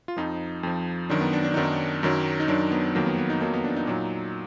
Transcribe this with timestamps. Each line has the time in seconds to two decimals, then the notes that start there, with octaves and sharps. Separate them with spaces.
0.08 F4
0.16 F2 F3 D#4
0.63 F2 F3
1.10 F#2 D#3 F#3 D4
1.21 B3
1.33 D4
1.45 D4
1.54 F#2 D#3 F#3 D#4
1.63 D4
2.03 F#2 D#3 F#3
2.40 D#4
2.48 F#2 D#3 F#3 D4
2.72 B3
2.95 F2 D#3 F#3 A#3
3.06 B3
3.18 B3
3.30 D#4
3.41 F2 D#3 F#3 A#3
3.54 B3
3.64 D4
3.76 D#4
3.87 A#2 F#3